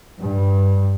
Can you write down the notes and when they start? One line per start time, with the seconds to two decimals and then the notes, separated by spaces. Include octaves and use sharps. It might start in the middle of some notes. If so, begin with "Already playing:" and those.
0.21 G2